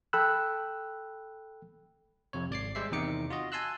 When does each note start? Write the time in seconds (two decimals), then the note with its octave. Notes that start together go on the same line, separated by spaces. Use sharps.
0.13 A4 G5 B5 E6 F#6
2.33 F2 C3 C#5
2.50 G#1 D5 D6 C7
2.75 G3 G#3 C5 E5 C7
2.91 E2 C3 D#3 D#4 D6 C#7
3.30 F4 F#4 D#5
3.52 G#5 A5 C6 E6 F#6